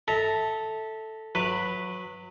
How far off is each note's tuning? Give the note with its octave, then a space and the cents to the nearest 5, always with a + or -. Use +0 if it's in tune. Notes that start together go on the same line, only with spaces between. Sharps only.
A4 +0 E5 -20 A#5 +0
F#3 -20 B4 +0 E5 +0